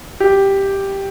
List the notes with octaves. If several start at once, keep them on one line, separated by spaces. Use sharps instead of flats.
G4